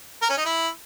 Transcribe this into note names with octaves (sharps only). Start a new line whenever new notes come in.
A#4
C#4
D#4
E4